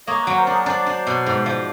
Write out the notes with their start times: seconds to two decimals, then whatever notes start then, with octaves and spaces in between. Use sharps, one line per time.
0.07 A#3 C#5 D#5
0.22 F#3 B4 C#5
0.37 A#4 C5
0.47 D4
0.52 G#4 A#4
0.66 D4 C5 D5
0.86 D4
1.07 B2
1.26 G#2
1.46 F3